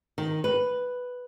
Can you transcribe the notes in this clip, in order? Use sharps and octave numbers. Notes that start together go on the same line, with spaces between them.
D#3
B4